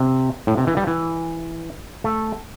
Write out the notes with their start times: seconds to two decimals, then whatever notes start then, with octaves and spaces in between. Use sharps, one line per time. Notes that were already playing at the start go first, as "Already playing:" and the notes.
Already playing: C3
0.47 A2
0.57 C3
0.67 E3
0.77 G3
0.87 E3
2.04 A3